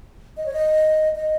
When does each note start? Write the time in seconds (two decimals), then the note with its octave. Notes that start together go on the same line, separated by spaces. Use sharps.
0.37 D#5
0.46 C#5
0.53 D#5
1.16 D#5